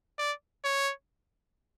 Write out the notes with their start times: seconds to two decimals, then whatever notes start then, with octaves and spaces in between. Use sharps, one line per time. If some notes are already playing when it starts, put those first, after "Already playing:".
0.18 D5
0.64 C#5